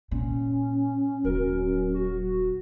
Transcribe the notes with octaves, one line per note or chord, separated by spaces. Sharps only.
A#2 C#4
D#1 F#3 A#4
F#4